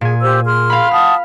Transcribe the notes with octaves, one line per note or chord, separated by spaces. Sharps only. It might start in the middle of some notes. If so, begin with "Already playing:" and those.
A#2 G#4 G#5
G4 C5 E6
G#4 C6 F6
F5 B5
F#5 A5 D#6 F6